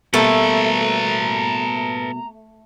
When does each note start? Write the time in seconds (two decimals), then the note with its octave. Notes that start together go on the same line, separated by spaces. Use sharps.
0.14 B2 G3 A3 A#3 A4 B4 A#5